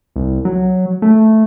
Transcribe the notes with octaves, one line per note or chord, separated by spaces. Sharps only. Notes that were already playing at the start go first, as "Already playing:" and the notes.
C2
F#3
A3